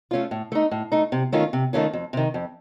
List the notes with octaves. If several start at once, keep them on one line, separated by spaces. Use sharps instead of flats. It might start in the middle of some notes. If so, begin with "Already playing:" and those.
A3 C#4 F4
A2
A3 D#4
A2
A3 D#4
C3
D#3 A3 C#4 F4
C3
D#3 A3 C#4 F4
F2
C3 D#3
F2